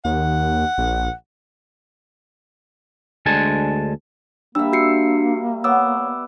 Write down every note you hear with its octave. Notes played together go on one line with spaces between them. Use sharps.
D#2 F#5
A#1
D2 G#3 D4 G#5 A5
G3 A#3 D4 E5 E6
F#4 C7 C#7
B3 C#5 D6 E6